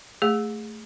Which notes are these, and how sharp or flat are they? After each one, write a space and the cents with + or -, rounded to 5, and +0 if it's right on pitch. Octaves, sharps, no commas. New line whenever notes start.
A3 +0 G#4 -10